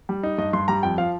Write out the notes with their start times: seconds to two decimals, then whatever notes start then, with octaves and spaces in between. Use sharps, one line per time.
0.09 G3
0.23 D#4
0.38 G2 D#5
0.53 G2 C6
0.68 G3 A#5
0.83 F2 G5
0.98 F3 F5